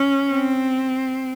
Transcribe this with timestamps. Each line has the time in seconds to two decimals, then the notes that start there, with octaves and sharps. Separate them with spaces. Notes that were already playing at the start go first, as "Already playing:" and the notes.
Already playing: C#4
0.31 C4